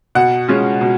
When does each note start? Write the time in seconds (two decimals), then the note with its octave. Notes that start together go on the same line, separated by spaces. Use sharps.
0.15 B2 F#5
0.48 G#3 C#4 F4
0.81 B2